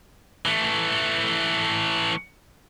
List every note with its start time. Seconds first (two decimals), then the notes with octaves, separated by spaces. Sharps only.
0.46 E3 A3